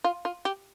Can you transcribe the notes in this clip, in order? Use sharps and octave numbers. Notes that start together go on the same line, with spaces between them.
F4
F4
G4